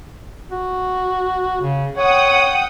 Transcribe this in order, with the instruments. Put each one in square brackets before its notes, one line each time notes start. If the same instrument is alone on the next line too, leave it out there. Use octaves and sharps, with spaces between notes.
[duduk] F#4
C#3
[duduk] C#5 [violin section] F#5 G5 D#6